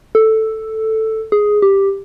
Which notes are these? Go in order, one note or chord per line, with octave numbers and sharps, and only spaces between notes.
A4
G#4
G4